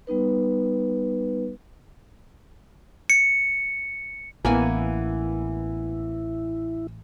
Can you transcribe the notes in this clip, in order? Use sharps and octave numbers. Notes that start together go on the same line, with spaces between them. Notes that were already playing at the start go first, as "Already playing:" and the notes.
G3 B3 D#4 B4
C#7
A1 E3 A#3 B3 E4 G#5